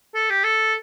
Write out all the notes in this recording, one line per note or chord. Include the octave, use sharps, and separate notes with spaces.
A4
G4
A4